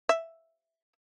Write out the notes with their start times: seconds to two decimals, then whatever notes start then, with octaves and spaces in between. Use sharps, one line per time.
0.09 E5